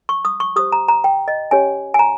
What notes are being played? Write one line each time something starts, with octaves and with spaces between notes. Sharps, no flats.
C#6
D#6
C#6
G4 C5 D#6
A#5
A#5
G5
D#5
C#4 G4 C#5 G#5
G#5
A#5